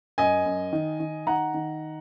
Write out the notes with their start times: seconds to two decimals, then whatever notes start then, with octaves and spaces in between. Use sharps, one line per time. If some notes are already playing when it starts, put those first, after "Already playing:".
0.18 F#2 D#5 G#5
0.46 F#2
0.73 D#3
1.00 D#3
1.27 D#3 F#5 A#5
1.54 D#3